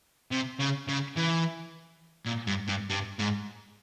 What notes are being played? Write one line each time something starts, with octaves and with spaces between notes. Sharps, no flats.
C3
C#3
C#3
E3
A#2
G2
G2
G2
G#2